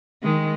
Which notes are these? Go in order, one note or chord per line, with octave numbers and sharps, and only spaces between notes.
D#3 G#3